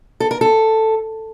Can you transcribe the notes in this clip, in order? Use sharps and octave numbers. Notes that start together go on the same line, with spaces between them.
A4
A#4
A4